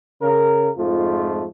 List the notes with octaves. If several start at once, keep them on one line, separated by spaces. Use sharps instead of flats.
C#3 A#4
F2 G#2 F3 A3 F4